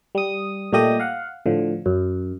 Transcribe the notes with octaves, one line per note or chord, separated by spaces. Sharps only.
G3 D#6
A#2 G3 A3 G4 D#5 D#6
F5 F#5
A2 D3 F3
F#2